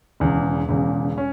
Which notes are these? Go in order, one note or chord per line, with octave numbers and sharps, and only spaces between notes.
E1 E2 C#3
E1 E2 C#3
C#4